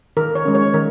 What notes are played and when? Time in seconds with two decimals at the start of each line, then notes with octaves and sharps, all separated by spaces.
0.17 D#3 A#4
0.35 C#5
0.45 G#3 C#4
0.55 C#5
0.74 D#3 A#4